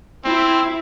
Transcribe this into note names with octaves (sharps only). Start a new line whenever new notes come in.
C4 E4